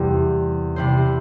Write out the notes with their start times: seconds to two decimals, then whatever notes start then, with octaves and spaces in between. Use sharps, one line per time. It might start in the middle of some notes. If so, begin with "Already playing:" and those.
Already playing: E2 C3 G3 E4 C5
0.76 C3 G3 E4 C5